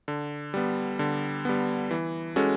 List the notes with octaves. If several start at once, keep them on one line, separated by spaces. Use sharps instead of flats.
D3
G3 B3
D3
G3 B3
E3
G#3 C#4 F#4 A4